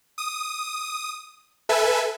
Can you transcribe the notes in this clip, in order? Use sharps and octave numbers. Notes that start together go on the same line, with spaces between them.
D#6
A4 B4 E5 G#5